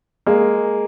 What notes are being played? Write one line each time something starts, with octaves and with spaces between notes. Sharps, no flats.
G#3 A#3